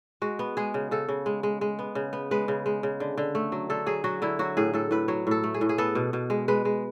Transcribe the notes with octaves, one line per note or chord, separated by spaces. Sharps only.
G#3 F#4
B3
G#3 G#4
C#3
C#3 A4
C#3
G#3
G#3
G#3
B3
C#3
B3
G#3 B4
C#3
G#3
C#3
D3
D3
A3
F#3
D3 A4
F#3 G#4
F#3 F#4
D3 E4
F#3 F#4
A2 G#4
A2 A4
A2 B4
F#3 C#5
A2 A4
A3
G#4
A2
G#4
B3 A4
B2
B2
G#3
G#3 B4
G#3